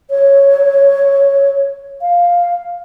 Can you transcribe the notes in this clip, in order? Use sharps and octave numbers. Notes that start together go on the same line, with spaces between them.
C#5
F5